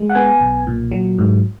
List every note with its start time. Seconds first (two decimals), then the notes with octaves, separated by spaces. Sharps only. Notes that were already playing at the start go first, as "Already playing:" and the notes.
Already playing: G#3
0.10 F#5
0.15 B3 G#5
0.40 B1
0.67 A#2
0.91 F#3
1.18 G#2